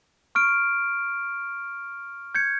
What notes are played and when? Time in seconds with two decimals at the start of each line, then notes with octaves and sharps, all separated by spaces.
0.35 C#6 F6 D7
2.35 G6 G#6 C#7